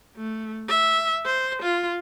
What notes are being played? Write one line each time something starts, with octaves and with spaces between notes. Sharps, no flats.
A3
E5
C5
F4